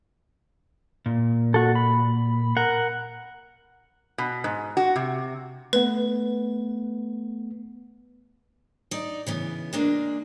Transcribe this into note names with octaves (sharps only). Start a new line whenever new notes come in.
A#2
F#4 A4
B5
A#4 F#5
B2
G#2
F#4
C3
A3 B3 B4
D#4 D5
C#3 E3 B3
G#3 A#3 D4